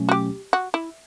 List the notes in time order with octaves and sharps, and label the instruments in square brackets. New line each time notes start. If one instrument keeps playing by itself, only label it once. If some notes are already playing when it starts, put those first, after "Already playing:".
Already playing: [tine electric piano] B2 F#3 A3 C#4
[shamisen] F#4
G4
F#4
E4